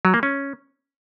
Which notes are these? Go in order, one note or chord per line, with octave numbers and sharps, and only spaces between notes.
F#3
A#3
C#4